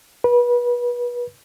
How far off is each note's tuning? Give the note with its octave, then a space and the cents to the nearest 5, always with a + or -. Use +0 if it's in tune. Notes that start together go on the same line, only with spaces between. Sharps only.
B4 -30